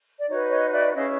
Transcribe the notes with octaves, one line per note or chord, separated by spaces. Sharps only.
D5
D#4 F#4 B4 C#5
C#5 D#5
D5 E5
C#4 E4 G#4 C#5 D#5 F5